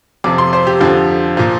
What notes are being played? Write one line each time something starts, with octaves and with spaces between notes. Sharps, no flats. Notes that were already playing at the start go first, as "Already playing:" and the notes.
F2 C3 F3 D6
C6
C5
G4
F2 D3 F3
A#2 F3